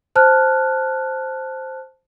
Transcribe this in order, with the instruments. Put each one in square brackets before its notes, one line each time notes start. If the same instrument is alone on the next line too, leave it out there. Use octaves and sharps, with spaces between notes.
[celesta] C5 A5 F6 F#6